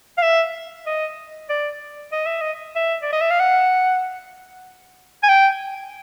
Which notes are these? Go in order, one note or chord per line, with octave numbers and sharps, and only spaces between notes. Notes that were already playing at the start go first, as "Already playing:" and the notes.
F5
E5
D#5
D5
D#5
E5
D#5
E5
D5
D#5
E5
F5
F#5
G#5
G5